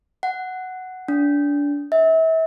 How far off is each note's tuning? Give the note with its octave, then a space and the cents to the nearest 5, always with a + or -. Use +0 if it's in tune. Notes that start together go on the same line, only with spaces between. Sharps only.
F#5 +5
D4 -25
E5 -35